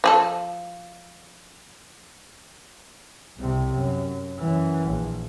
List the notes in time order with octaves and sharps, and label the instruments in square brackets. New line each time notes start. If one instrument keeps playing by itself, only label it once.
[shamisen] F3 G#4 A4
[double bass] C2 C3
F#2
F#2 E3
A#1